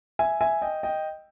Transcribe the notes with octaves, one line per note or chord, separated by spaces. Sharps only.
E5 G#5
E5 G#5
D#5 G5
D#5 G5